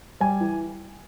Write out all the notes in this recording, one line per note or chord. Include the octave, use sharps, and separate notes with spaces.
G3 G#5
E3